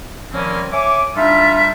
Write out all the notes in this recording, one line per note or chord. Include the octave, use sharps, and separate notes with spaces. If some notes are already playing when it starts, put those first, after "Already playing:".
D#3 F3 G3 A#3 C4 C#4
C#5 E5 G#5 D6
G3 D4 D#4 F4 A4 E5